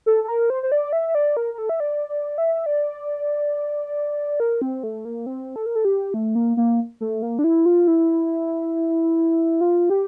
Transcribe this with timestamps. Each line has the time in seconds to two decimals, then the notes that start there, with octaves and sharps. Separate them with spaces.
0.06 A4
0.24 A4
0.28 A#4
0.50 C5
0.63 C5
0.72 D5
0.93 E5
1.15 D5
1.37 A#4
1.54 A#4
1.58 A4
1.69 E5
1.80 D5
2.09 D5
2.38 E5
2.66 D5
4.40 A#4
4.62 C4
4.83 A3
5.05 A#3
5.26 C4
5.56 A4
5.66 A#4
5.75 A4
5.85 G4
6.14 A3
6.35 A#3
6.57 A#3
7.01 A3
7.22 A#3
7.39 D4
7.44 E4
7.66 F4
7.87 E4
9.61 F4
9.90 G4